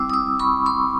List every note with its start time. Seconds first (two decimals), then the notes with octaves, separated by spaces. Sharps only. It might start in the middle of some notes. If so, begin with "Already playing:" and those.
Already playing: G3 C4 E4 D6 E6
0.10 D#6
0.13 D6 E6
0.39 B5 C#6
0.66 C6 D6